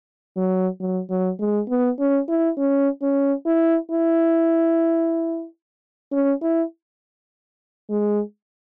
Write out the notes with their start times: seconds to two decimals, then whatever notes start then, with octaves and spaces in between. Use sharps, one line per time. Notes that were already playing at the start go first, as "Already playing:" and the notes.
0.37 F#3
0.80 F#3
1.10 F#3
1.40 G#3
1.69 B3
1.99 C#4
2.29 E4
2.58 C#4
3.02 C#4
3.46 E4
3.91 E4
6.12 C#4
6.42 E4
7.90 G#3